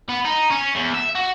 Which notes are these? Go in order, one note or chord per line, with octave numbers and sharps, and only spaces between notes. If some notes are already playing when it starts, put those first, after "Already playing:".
B3
D#4
C#4
E2
E5
F#4